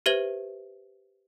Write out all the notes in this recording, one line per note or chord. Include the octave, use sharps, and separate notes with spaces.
G4 B4 C5 E5 G#6 F#7